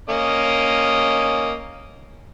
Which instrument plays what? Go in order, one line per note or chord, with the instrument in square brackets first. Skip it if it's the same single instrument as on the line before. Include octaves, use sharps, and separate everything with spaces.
[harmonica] A#3 C#4 D#5